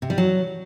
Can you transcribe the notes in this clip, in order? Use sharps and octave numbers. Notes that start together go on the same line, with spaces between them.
C3
G3
F#3